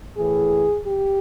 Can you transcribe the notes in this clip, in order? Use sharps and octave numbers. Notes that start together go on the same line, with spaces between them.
A2 E3 G#4
G4